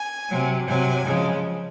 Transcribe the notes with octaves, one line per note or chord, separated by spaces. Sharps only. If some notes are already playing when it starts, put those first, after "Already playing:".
Already playing: G#5
C3 F#3
C3 F#3 G#5
C#3 F3 G#3